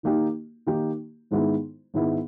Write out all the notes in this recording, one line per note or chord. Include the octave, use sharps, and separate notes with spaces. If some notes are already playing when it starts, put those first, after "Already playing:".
D#3 A#3 D#4 G4
D#3 A#3 D#4 G4
G#2 D#3 G#3 B3 E4
G#2 D#3 G#3 B3 E4